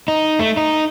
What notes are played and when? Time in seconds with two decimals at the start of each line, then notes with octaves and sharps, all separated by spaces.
0.08 D#4
0.39 A3
0.57 D#4